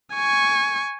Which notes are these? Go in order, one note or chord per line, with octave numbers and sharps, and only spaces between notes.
G#5 C#6